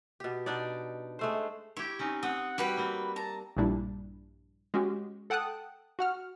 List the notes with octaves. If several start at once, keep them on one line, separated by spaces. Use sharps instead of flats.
B2 G4
B2 D4 D#4 D5
G#3 A3 C5
E4 G4 C#5
C4 C#4 D#4
C4 F#5 D#6
G3 F#4 B4 G5
A#3 C4 B5
A5 A#5
A#1 G2 A#2 G3 D4 E4
G#3 C#4 F#4 G4
A4 F#5 G5 A5 D#6 F#6
F#4 F#5 F6